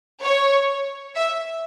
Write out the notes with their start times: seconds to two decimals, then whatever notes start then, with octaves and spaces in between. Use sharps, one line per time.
0.22 C#5
1.15 E5